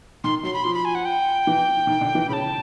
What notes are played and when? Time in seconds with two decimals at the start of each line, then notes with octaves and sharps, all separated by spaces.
0.24 D#3 C6
0.43 F#3 C6
0.54 B5
0.64 F3 C6
0.74 B5
0.85 G#5
0.95 F#5
1.05 G5
1.47 E3
1.87 D#3
2.01 D3
2.15 E3
2.29 C#3 B5
2.33 A5